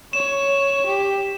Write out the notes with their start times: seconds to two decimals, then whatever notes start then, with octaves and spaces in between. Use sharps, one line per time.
0.13 C#5 E7
0.86 G4